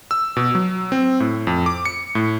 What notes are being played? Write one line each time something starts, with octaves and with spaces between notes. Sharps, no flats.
E6
B2
F#3
C4
A2
F2
D6
C#7
A2